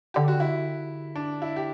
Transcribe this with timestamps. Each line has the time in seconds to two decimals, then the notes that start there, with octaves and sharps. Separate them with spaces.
0.14 D3 G4
0.28 F#4
0.40 E4
1.15 D4
1.42 E4
1.56 G4